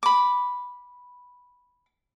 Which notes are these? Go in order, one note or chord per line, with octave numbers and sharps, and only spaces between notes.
B5 D6